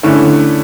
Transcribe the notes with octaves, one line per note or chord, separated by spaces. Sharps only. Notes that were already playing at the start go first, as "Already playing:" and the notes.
D3 A3 C#4 E4